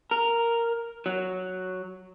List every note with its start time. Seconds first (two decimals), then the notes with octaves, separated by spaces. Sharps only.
0.11 A#4
1.06 F#3